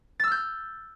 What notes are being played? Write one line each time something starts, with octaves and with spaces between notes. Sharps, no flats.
E6 F6 G6 A6